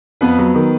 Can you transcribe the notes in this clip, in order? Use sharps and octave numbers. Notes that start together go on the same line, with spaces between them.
F2 B3 B4
F#3
D#3